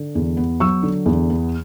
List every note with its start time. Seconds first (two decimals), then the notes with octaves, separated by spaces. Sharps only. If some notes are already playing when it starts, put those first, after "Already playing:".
Already playing: D3
0.15 E2
0.37 B3
0.60 F#3 C#6 E6
0.83 D3
1.06 E2
1.30 B3